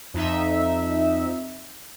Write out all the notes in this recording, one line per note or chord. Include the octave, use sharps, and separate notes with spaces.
F2 D#4 E5